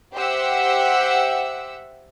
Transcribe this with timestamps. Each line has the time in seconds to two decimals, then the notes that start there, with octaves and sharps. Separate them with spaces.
0.14 G4 C5 E5 F#5 E6